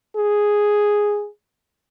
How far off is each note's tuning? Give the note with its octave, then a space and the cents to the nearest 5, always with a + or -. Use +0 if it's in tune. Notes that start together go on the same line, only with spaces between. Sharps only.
G#4 +0